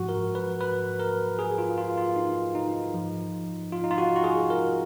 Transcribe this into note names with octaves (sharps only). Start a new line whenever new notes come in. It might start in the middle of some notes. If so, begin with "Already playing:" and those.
Already playing: G#2 F3 F#4
A#4
B4
B4
A#4
G#4
F4
F4
F4
D#4
D#4
G#2 F3
F4
D#4
F4
F#4
F#4
G#4
A#4